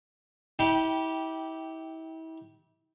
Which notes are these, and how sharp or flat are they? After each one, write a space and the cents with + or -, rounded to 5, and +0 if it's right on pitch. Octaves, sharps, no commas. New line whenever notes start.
E4 -35 G4 -10 G5 +0